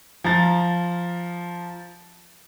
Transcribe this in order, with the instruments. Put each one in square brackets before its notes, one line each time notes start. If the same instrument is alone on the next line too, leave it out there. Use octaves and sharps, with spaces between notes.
[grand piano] F3 A#5 A6